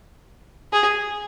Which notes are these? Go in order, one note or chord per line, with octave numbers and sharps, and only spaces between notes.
G#4